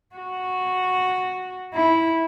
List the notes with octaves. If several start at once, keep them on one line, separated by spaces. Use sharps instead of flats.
F#4
E4